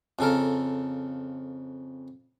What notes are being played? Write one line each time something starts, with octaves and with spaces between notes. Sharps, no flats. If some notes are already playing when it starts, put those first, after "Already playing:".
F2 C#3 A4 A#4